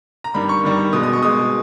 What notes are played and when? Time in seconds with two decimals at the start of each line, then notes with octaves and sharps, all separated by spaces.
0.24 A#5
0.34 G2 D#3 G3 B5
0.49 C#6
0.63 G2 D#3 G3
0.93 B2 G#3 D#6
1.03 D#6
1.13 C#6
1.22 B2 G#3 D#6